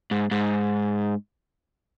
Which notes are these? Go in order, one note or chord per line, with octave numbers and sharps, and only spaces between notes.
G#2
G#2